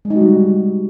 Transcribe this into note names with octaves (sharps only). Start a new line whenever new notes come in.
G#3
D#4
F#4
G3